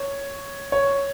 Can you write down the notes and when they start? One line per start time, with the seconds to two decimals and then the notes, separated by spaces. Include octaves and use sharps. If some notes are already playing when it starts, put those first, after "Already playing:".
Already playing: C#5
0.72 C#5